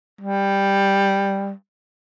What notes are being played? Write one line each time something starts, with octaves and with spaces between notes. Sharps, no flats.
G3